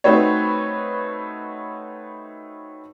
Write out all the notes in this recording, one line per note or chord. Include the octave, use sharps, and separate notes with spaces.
A3 C4 D#4 F#4 B4 C#5